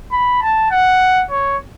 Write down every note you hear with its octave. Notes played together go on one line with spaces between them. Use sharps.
B5
A5
F#5
C#5